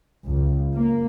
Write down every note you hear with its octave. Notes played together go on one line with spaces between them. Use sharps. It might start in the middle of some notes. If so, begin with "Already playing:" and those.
C#2
A#3